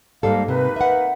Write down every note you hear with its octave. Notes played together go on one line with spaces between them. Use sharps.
G#2 G3 A#3 A4 F5
C3 A#3 D#4 B4
E5 F#5